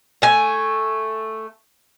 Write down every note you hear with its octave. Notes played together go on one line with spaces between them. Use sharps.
A3 G#5